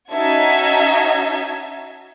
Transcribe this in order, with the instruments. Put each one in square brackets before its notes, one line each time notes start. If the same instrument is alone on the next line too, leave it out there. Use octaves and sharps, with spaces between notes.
[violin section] C#4 D#4 F#4 E5 A5 G#6